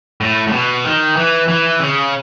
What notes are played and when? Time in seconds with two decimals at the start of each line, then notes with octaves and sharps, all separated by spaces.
0.21 A2
0.48 A2
0.52 B2
0.85 D#3
1.17 E3
1.48 E3
1.80 C#3